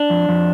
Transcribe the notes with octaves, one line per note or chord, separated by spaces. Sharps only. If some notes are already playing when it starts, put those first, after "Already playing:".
Already playing: D4
F2
F2